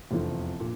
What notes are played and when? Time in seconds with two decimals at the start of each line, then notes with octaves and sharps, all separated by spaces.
0.11 F1 E2 C3 F3
0.60 A#2